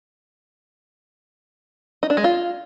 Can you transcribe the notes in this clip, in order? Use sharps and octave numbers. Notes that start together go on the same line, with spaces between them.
D#4
D4
G#3
F4